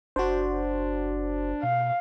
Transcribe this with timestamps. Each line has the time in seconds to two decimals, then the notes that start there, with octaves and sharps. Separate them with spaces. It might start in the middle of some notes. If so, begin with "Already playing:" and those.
0.16 F#1 D4 F#4 C5
1.63 B2 F5